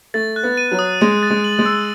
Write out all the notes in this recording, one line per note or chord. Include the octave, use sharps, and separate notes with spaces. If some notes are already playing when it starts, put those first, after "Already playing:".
A3 A6
F#6
B3
D#7
F#3
D#6
G#3 D#7
A6
G#3
F#7
G#3
E6